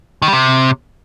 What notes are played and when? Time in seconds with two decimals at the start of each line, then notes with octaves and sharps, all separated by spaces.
0.22 D#3
0.28 G3
0.33 C3